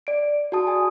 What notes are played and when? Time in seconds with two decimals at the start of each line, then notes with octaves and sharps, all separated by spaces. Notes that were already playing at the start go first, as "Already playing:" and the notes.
0.07 D5 D7
0.52 F#4 G#4 A5 D#6
0.67 G#5 A5